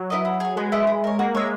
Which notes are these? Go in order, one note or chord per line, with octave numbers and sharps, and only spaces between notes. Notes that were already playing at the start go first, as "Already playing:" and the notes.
Already playing: F#3
E4 B4 D#5
E4
G#4 C#5
G#3 B3
E4 B4 D#5
E4
A#4 C#5
A#3 F#4
G#3 C#5 E5